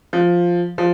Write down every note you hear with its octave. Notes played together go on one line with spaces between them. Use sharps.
F3
F3